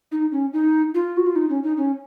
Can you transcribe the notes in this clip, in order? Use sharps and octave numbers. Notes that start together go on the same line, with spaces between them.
D#4
C#4
D#4
F4
F#4
F4
D#4
C#4
D#4
C#4